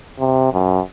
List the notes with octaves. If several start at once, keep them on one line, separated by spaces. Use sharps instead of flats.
C3
F#2